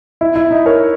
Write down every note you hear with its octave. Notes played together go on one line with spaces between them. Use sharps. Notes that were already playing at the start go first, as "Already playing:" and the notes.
E4
E4
D#4
A#4 C#5